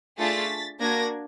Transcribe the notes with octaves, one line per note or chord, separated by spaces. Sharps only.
A3 D4 F4 G#4 A6 B6
A#3 D4 F#4 G#6 A#6